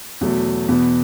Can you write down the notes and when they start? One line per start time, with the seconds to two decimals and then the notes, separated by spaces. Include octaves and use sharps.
0.21 E2 B2 F#3 A3
0.68 E2 B2 B3